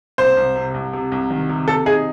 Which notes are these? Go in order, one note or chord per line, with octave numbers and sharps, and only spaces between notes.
C2 C5
C2
C3
C2
C3
C2
D#3
C3
C3 A4
D#4 G#4